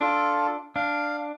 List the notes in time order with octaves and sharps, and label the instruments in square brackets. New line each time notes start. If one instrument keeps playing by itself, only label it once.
[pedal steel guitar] D4 [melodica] F4 A4
[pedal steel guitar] D4 [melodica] F5